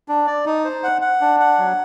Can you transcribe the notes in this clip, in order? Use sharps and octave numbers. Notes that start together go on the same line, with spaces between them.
D4
D5
D#4
C5
F#5
F#5
D4
F#5
F#3